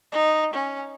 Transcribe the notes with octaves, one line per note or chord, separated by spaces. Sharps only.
D#4
C#4